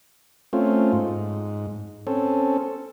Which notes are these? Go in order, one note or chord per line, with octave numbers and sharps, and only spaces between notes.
A3 C4 C#4 F4
G#2
C4 C#4 A4